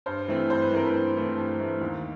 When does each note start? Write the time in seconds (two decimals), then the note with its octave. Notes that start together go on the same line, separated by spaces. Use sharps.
0.06 G2 C5
0.28 E3 A3 C4
0.50 G2 C5
0.62 B4
0.71 E3 A3 C4 A#4
0.86 B4
0.93 G2
1.15 E3 A3 C4
1.37 G2
1.59 E3 A3 C4
1.81 D#2